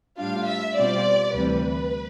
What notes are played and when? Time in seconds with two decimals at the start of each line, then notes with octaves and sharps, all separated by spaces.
0.17 A2 G3 D4 F4 F5
0.46 E5
0.76 B2 G3 C4 F4 D5
1.35 D2 C3 E3 G3 B4